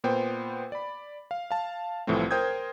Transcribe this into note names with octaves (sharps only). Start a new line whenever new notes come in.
A#2 B3 C5 G5
D5 B5
F5
F5 A5
C2 A2 E3 F3 A3 C4
A#4 C5 G5 D#6 G6 G#6